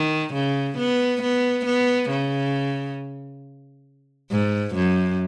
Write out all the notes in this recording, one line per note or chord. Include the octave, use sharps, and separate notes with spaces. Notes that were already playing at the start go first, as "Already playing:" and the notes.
Already playing: D#3
C#3
B3
B3
B3
C#3
G#2
F#2